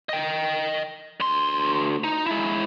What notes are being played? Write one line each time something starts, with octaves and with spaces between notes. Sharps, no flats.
D#5 G5
D2 C6
D#4
G#3 E4